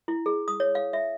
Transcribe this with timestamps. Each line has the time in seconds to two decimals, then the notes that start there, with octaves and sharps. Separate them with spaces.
0.08 E4
0.26 G#4
0.48 D#6
0.60 C#5
0.75 F5
0.93 E5